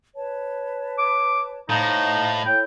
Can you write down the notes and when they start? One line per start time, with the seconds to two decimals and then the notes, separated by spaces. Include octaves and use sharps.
0.14 B4 C#5 A5
0.98 D6
1.69 A2 D#4 C5 D#5 F5
2.46 E4 A4 C#5 G5